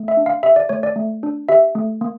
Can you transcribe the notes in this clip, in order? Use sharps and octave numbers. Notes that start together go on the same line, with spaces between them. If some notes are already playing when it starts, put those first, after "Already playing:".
Already playing: A3
E5
D4
F5
G4 E5
D5
A3 C#5
D5
A3
D4
G4 E5
A3
A#3